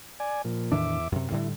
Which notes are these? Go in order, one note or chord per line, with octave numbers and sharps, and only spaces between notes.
D5 G#5
A#2 F3
E2 A2 D#3 D4 E5 D6
F#2 C3
A2 D3 G3 E4